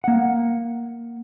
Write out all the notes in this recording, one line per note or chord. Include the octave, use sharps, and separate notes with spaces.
A#3 F#5